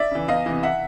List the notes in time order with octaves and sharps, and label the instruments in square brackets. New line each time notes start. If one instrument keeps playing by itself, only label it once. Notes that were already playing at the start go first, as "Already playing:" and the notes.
Already playing: [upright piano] D5 E5
C#3 E3
E2 D#5 F5
C3 E3
E5 F#5